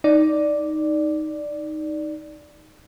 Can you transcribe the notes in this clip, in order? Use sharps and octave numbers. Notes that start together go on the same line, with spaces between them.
D#4 D5